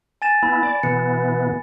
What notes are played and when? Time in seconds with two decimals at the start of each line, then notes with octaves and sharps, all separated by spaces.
0.22 G#5 A6 E7
0.43 B3 E4 B5
0.63 D5
0.83 B2 E3 B3 C#7